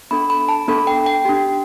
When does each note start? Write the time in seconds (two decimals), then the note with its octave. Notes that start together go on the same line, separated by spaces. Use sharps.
0.11 B3 D4 A4 B5
0.30 B5
0.49 A5
0.68 B3 D4 A4 B5
0.87 G5
1.06 G5
1.25 D4 G4